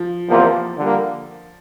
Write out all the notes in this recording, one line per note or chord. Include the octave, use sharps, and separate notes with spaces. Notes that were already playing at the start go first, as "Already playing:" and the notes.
Already playing: F3
E2 C3 F3 A#3 F4
D3 G3 A#3